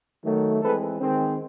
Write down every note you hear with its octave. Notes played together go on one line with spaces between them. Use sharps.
D#3 F#3 A3
E3 G#3 C4 A4 B4
D#3 G#3 C4